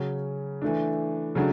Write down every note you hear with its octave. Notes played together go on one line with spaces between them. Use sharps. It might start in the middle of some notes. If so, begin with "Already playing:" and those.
Already playing: C#3 F#3 C#4
E3 A3 D4
C#3 F#3 A3 D4